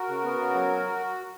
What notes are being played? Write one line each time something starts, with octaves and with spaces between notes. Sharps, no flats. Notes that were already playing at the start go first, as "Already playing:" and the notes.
Already playing: F#4 A#4
C#3
B3
C#3
F#3